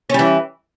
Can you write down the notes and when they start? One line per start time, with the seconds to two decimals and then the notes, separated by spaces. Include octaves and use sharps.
0.10 C#4
0.14 G3
0.19 E3